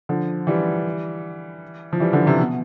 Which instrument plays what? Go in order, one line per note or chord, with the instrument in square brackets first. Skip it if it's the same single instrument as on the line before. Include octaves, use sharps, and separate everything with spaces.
[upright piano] D3 F3
E3 G3
F3
E3 G3
D3 F3
C3 E3
B2